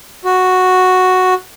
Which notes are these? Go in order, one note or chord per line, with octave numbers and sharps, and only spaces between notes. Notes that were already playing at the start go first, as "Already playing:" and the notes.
F#4